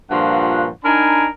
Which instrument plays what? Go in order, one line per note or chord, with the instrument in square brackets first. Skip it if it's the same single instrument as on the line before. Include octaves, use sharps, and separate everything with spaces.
[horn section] G2 A#2 F3 F#4 F#5
D4 D#4 A#4 G#5 B5